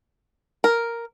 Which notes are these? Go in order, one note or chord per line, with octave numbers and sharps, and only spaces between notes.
A#4